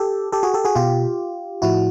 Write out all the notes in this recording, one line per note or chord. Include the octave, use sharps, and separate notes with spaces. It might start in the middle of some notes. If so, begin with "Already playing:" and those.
Already playing: G4 A4
G4 A4
F#4 G#4
G4 A4
F#4 G#4
B2 F4 G4
A2 F3 E4 F#4